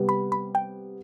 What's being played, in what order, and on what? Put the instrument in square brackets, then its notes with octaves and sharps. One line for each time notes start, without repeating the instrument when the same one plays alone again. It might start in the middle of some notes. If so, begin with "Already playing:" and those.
Already playing: [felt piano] C3 G3 B3
[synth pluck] B5
B5
G5